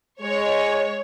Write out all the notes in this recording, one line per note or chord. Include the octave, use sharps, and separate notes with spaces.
G#3 C#5